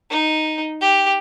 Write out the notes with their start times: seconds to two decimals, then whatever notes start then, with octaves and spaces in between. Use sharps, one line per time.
0.10 D#4
0.81 G4